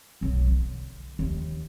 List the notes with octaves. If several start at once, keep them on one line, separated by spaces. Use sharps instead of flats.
B1 F#2
D3
D#2